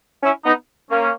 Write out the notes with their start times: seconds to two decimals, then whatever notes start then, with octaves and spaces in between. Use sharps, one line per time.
0.23 C#4 E4
0.45 B3 D#4
0.89 A#3 C#4